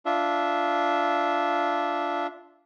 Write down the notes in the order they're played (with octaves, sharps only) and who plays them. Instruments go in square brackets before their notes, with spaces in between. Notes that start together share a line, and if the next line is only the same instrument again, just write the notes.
[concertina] D4 F4 E5